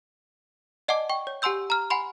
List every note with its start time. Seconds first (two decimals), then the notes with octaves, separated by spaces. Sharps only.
0.88 D5 D#5 F#5 G#5 A5 D6
1.09 G5 C#6
1.27 C#5
1.42 G4 F#5 G#5 C6 E6 G6
1.70 A#5 F6
1.90 F#5 G#5 B5 C6